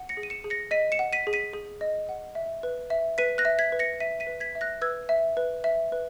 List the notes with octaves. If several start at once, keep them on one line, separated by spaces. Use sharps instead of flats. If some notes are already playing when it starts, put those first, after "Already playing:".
Already playing: F#5
A#6 C#7
G#4
D#7
C#7 E7
G#4
A#6 C#7
D#5 B6 D#7
C#7 E7
F#5
B6 D#7
G#4
B6 D#7
G#4
D#5
F#5
E5
B4
E5
B4 B6 D#7
F#6 A#6
E5
G#6 B6
B4
A#6 C#7
E5 B6 D#7
B6 D#7
B4
G#6 B6
E5
F#6 A#6
B4 E6 G#6
E5
B4
E5
B4